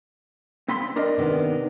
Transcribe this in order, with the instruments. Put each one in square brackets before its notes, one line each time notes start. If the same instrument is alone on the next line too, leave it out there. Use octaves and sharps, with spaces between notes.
[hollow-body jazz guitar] C4 B5 C6
D4 A#4 D#5
[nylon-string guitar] C3 D#3 B3